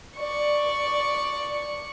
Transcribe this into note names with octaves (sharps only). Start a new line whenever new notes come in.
D5 C#6